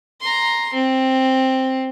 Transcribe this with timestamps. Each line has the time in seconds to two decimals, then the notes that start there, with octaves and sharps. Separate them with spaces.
0.21 A#5 C6
0.73 C4